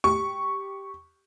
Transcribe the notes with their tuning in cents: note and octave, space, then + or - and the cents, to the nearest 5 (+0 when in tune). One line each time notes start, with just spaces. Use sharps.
G4 +0 C#6 +0